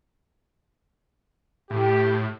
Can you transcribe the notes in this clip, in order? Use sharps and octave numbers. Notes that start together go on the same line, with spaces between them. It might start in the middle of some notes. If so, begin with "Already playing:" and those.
A2 G4